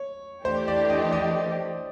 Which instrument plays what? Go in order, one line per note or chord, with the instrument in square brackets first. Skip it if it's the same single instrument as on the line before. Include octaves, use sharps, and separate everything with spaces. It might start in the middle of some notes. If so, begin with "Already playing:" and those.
Already playing: [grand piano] C#5
[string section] E3 A3 D4 G4 [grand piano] C5
[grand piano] D5
D#5
D#5